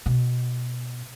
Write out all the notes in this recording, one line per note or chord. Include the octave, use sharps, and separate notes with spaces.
B2